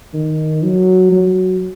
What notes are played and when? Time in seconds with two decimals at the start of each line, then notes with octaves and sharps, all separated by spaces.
0.14 D#3
0.63 F#3
1.12 F#3